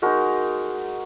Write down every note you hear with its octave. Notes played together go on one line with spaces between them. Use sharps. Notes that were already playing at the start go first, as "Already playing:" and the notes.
G#3 D#4 F#4 A#4